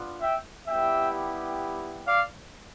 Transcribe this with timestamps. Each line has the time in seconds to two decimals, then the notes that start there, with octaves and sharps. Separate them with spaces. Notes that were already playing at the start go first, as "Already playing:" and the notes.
Already playing: B3 D4 F4
0.21 E5 G5
0.67 G3 B3 E4 G4 E5 G5
2.08 D5 F5